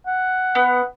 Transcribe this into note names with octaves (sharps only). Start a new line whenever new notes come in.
F#5
B3